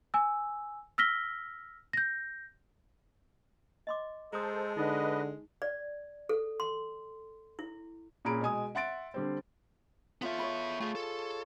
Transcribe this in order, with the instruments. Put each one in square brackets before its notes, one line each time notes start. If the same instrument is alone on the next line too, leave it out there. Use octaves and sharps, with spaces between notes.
[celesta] G#5 E6
E6 F6 A#6 B6 G7
G6 A#6
[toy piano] D#5 C6 D6
[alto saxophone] G#3 [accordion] A4 C5 [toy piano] A#5 D#6
[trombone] D3 [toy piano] D#4 [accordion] B4 D#5
[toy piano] D5
A4
C6
E4
[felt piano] A#2 C#4 G#4 A#5 B5 D7
B2 G#3 G#5 D#6
E5 F#5 C6 A6 D7
D3 G3 C4
[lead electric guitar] B3 E5 [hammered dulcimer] F4 A4 C#5
[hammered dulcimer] C#5 D#5 B5
[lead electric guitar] D2 A3 [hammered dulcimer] F4 G#4 A5
[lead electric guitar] A4